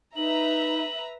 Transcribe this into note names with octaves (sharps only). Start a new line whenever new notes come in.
D#4 B4 E5 A#5 F#7